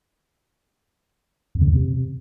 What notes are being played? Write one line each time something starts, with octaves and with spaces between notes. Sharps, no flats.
F2
C#3
F2
C3